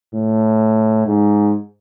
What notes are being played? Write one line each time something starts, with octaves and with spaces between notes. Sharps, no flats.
A2
G#2